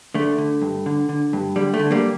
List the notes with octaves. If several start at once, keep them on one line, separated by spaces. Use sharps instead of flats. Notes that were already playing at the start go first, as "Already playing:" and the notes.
D3 A3
D3
G2
D3
D3
G2
D3 G3
A3
D3
G3 A#3